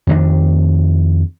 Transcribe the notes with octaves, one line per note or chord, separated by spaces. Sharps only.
F2 D#3 B3 D4